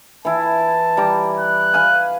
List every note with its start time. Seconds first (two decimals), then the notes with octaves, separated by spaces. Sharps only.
0.25 E3 E4 A5
0.97 G3 A#5 D6
1.39 F#6
1.74 B4 F5 G#5